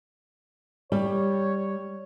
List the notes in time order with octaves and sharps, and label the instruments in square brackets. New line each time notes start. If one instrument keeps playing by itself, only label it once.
[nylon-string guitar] G3 [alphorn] C#5